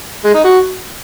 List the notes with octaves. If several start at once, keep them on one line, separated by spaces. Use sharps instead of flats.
G#3
D#4
F#4